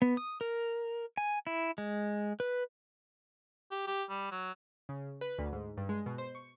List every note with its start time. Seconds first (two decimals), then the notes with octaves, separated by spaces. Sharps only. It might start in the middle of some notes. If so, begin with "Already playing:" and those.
0.02 B3
0.17 D#6
0.41 A#4
1.17 G#5
1.47 E4
1.78 G#3
2.40 B4
3.71 G4
3.87 G4
4.09 G3
4.31 F#3
4.89 C#3
5.21 B4
5.39 D2
5.53 G#2
5.77 G2
5.89 G#3
6.06 B2
6.18 C5
6.35 C#6